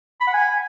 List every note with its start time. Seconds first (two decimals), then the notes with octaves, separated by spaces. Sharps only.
0.20 B5
0.27 F#5
0.34 G#5